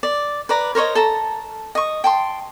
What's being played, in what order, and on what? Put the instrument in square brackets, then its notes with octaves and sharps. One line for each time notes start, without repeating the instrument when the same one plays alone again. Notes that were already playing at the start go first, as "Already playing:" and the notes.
[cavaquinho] D5
B4 D5 A#5
A#4 C5 C#5 D#5
A4 A5 A#5
D#5 C#6
G5 A5 C6